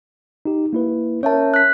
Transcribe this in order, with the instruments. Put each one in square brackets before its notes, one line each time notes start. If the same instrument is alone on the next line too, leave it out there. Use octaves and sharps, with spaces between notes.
[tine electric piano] D#4 G4
A#3 E4 B4
[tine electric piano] C#4 A#4 [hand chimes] C#5 E5 A5
[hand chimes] F#6 B6